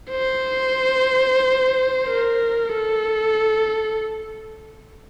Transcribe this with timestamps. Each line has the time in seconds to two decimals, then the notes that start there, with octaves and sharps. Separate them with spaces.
0.10 C5
2.07 A#4
2.74 A4